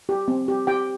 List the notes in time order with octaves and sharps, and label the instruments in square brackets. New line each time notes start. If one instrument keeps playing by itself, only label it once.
[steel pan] G4
C4
G4
G4 G5